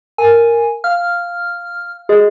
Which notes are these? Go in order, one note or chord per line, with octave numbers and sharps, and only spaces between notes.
A#4 G#5
F5 F6
F#4 G#4 D#5